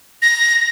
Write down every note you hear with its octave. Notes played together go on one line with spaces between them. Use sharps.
A#6